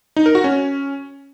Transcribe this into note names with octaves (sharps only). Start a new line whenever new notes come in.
D#4
A#4
F#4
C#4